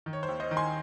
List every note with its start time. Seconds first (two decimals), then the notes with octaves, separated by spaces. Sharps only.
0.06 D#3
0.13 C#5
0.23 C5
0.29 D#2
0.40 C5 D#5
0.51 D#3
0.57 G#5 C6